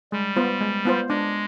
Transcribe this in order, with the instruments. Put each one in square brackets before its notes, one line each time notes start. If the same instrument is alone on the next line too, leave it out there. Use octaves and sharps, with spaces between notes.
[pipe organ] G3 [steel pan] G#3
[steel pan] B3 F4 C5
G#3
B3 F4 C5
[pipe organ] G#3 [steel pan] D4